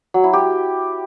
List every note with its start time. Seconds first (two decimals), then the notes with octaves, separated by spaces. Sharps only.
0.14 F#3
0.24 E4
0.33 G4